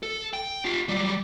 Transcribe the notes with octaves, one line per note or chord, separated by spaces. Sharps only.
A4
G5
F4 G4
F#3 G3